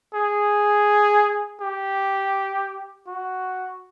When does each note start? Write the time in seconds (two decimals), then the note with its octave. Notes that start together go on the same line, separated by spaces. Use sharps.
0.14 G#4
1.60 G4
3.07 F#4